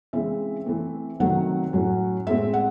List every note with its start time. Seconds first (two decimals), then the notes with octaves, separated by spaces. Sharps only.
0.13 C#3 E3 G#3 C4 E5
0.66 E3 A3 C4
1.20 C3 D#3 F#3 A3 C4 F#5
1.73 A2 F#3 C#4
2.26 A2 G#3 C4 E5
2.54 F#5